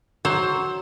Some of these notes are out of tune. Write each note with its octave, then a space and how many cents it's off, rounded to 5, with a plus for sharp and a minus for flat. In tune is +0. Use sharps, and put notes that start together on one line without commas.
F#3 +15 C5 +20